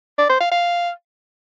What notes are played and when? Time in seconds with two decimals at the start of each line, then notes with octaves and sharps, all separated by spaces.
0.18 D5
0.29 C5
0.40 F5
0.51 F5